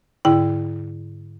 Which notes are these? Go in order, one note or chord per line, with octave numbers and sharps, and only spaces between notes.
G#2 D3 E4 G5